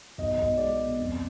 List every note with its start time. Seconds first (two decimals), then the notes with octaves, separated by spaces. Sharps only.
0.18 B1 D#5
0.38 B1 D#5
0.58 G#3 D5
0.78 B2
0.98 F2